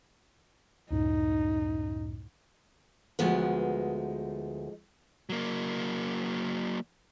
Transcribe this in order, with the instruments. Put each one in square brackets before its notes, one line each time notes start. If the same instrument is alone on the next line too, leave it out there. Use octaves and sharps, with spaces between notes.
[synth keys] C#2 F#2 A2 [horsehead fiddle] D#4
[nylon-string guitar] D2 B3 B4 [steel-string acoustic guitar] F3 G#3 D#4
[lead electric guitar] F#3 A#3